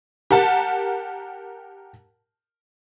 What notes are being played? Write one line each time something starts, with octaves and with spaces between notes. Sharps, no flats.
G4 A#4 F#5 A5